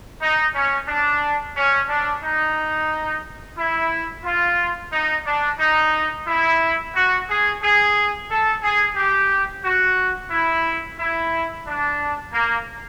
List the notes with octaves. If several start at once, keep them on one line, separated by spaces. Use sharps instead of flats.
D#4
C#4
D4
C#4
D4
D#4
E4
F4
D#4
D4
D#4
E4
F#4
G#4
G#4
A4
G#4
G4
F#4
E4
E4
D4
A#3